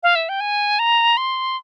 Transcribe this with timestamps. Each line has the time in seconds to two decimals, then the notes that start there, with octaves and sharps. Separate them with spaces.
0.03 F5
0.16 E5
0.29 G5
0.41 G#5
0.79 A#5
1.17 C6